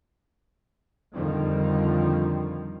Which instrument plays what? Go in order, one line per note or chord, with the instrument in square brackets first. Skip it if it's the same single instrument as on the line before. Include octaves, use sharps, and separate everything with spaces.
[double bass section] F2 D3 D#3 F3 G3